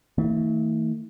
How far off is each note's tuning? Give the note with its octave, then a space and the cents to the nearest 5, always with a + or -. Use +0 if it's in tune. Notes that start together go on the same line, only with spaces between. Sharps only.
E3 -45 A3 +35